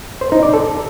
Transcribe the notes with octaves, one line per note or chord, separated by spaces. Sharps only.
C5
D#4
D5
A4